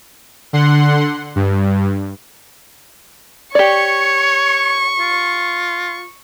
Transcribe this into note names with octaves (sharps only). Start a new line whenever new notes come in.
D3 F#5 C6
G2
G4 C#5 D5 C#6
F4